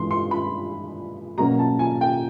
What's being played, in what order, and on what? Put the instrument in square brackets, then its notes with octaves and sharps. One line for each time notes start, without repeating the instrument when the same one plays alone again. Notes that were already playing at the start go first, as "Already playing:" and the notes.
Already playing: [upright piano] G2 E3 G#3 C6
C6
B5
B2 F#3 A#3 C#4 A#5
A5
G#5
G5